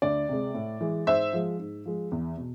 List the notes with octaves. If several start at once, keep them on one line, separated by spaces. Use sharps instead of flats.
D2 D5
C3 G#3
A2
E3 G#3
G#2 C5 E5
F3 G#3
G#2
F3 G#3
E2
B2